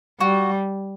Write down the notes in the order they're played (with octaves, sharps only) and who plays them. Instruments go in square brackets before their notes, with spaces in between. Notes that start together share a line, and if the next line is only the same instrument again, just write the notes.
[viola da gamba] G3 [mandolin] F#4